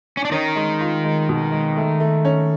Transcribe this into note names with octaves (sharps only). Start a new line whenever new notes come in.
C#4
D4
D#3 C#4 D#4
G#3
F4
G#3
B2
G#3
A3
A3
C#4